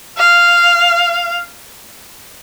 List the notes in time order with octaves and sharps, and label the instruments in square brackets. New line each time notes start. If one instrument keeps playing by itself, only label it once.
[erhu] F5